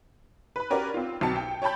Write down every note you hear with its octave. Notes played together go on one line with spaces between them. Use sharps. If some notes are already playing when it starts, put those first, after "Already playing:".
B4 B5
C#4 F#4 G4 A#4 B4 D5
C4 F4
B1 B2 C4 A5 C#7
G5
C#5 G5 A5 B5 G6